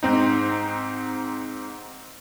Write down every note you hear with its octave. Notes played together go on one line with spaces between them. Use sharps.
G#2 C4 D#4